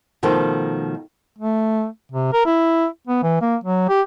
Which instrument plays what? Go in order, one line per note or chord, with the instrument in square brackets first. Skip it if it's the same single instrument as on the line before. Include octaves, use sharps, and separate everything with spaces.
[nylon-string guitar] B2 D#3 F3 A3 F4 A4
[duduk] A3
C3
A#4
E4
B3
E3
A#3
F#3
G4